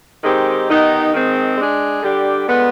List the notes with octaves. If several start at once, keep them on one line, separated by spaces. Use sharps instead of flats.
D#3 G#3 C4 D#4 G4
D#3 B3 D#4 G4
D#3 G#3 C4
G#3 D4 G#4
D3 G3 D4 G4
D3 G#3 B3 F4